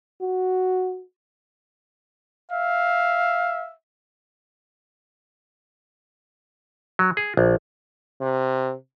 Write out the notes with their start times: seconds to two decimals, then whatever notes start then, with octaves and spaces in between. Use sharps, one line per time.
0.21 F#4
2.51 E5 F5
6.99 F#3
7.17 G#4
7.37 A#1
8.21 C3